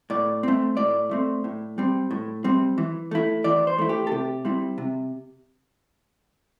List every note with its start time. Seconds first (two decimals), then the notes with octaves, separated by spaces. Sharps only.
0.10 A2 D5
0.43 A3 C4
0.77 A2 D5
1.11 A3 C4
1.44 A2
1.78 G3 C4
2.11 A2
2.44 G3 C4
2.78 E3
3.11 A3 E4
3.44 E3 D5
3.67 C5
3.78 A3 E4
3.89 G4
4.07 A4
4.12 C3 G4
4.45 G3 C4 E4
4.78 C3